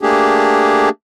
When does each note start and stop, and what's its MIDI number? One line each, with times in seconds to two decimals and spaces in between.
0.01 0.89 57
0.01 0.89 58
0.01 0.89 62
0.01 0.89 67
0.01 0.89 68